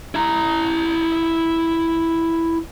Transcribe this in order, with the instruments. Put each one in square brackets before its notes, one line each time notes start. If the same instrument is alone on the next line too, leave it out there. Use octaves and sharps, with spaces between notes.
[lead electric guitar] E4 A#5